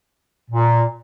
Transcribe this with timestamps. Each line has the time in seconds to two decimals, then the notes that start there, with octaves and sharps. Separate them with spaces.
0.51 A#2